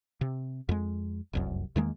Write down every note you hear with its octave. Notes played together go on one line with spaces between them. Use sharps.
C3
F2 G#3
F1 C2 F#2
E2 D#3 G#3 A#3